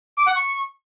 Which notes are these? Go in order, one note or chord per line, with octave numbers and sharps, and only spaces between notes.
D6
F#5
C#6